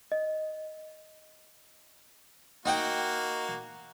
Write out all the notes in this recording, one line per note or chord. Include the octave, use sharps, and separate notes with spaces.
D#5
A#3 D#4 F#4 F#5 G5